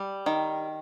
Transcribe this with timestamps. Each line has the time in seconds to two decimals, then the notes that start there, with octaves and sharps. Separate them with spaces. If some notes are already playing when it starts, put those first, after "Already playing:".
Already playing: G3
0.26 D#3